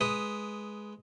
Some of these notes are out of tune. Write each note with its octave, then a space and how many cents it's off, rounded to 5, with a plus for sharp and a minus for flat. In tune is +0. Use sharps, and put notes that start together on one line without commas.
G#3 +10 B4 +0 D#6 +0